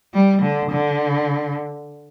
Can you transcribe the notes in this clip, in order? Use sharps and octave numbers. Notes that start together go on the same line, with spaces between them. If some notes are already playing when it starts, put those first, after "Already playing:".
G3
D3
D3